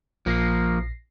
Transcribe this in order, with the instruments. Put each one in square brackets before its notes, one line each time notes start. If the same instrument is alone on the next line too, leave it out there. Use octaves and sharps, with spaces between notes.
[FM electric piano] A#1 A#6 C7 [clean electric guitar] F3 A#3